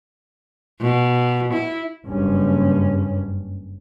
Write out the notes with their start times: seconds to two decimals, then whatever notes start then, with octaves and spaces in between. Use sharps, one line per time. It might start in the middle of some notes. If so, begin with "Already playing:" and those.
0.81 B2
1.53 E4
2.05 F#1 G2 C#4